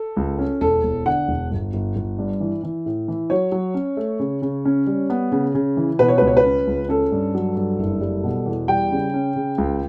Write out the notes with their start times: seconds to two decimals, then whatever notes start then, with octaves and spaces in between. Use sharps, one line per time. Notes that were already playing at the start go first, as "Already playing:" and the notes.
Already playing: A4
0.17 C#2
0.39 C#4
0.61 E1 A4
0.83 E1
1.06 D3 F#5
1.28 E1
1.51 G1
1.74 G1
1.96 G1
2.18 G2
2.40 E3
2.63 E3
2.86 A2
3.08 E3
3.30 F#3 C#5
3.52 F#3
3.74 C#4
3.97 A3
4.19 C#3
4.42 C#3
4.65 C#4
4.87 G3
5.10 B3
5.32 C#3
5.55 C#3
5.77 E3
5.99 B2 B4
6.08 C#5
6.18 C#2 B4
6.27 C#5
6.37 B4
6.44 C#4
6.67 C#2
6.89 C#4 A4
7.12 G2
7.35 F#3
7.56 G2
7.78 F#1
8.01 G3
8.24 B2
8.46 E2
8.68 G3 G5
8.92 C#3
9.14 C#4
9.36 C#3
9.58 C#2